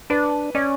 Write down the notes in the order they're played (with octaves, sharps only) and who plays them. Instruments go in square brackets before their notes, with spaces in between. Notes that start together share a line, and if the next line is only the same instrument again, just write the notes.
[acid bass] D4 [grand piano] B4
[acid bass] C#4 [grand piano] D5